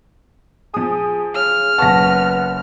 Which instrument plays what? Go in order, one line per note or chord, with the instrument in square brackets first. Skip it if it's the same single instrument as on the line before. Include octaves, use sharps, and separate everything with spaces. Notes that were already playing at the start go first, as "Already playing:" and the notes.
[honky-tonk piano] F3 D#6 [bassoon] G#4
[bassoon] C#3 [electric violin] F6
[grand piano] F#1 A5 [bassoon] B3 [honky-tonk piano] C#6 A#6